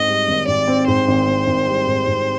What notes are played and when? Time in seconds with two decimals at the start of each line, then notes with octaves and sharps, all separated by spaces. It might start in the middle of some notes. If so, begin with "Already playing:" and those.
Already playing: G#2 C4 D#5
0.08 G3
0.28 G#1
0.48 G#1 D5
0.68 C4
0.87 G#2 C5
1.08 G#1
1.28 C4
1.47 G#1
1.67 G3
1.87 G#2
2.07 G#2